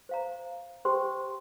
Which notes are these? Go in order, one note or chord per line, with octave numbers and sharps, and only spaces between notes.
C5 F5 A#5
G4 C5 G5 C6